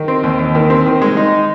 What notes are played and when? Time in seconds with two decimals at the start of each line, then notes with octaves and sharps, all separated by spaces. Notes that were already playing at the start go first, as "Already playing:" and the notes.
Already playing: D#3
0.08 C4
0.23 D#2
0.39 D#2
0.55 D#3
0.70 C4
0.86 D#3
1.02 G#3
1.17 D#4